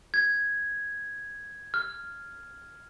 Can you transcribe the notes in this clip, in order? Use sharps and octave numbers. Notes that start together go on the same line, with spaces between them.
G#6
F6